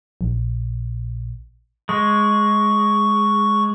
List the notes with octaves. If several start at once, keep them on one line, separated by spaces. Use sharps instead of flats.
A#1
G#3 C#6